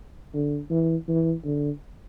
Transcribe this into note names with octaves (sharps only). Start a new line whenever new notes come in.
D3
E3
E3
D3